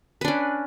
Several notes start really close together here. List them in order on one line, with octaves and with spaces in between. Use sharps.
B4 D4 C#4